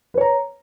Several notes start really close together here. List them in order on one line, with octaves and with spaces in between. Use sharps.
B4 C#5 A#5